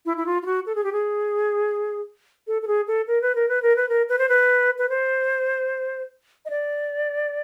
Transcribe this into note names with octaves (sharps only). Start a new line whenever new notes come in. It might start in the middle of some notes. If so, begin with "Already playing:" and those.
E4
E4
F4
F4
F#4
A4
G#4
G4
G#4
A4
A4
G#4
A4
A#4
B4
A#4
B4
A#4
B4
A#4
B4
C5
B4
B4
C5
D#5
D5